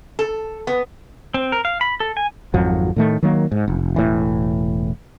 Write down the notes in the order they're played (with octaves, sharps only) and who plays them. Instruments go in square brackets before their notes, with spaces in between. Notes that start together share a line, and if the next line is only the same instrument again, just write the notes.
[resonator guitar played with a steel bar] A4
B3
[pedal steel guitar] C4
A#4
F5
B5
A4
G#5
[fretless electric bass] G#1 F2 F3 F#3
A2 D#3 A3
D#3 F#3 A#3
G#2
F1
E1 A2 E3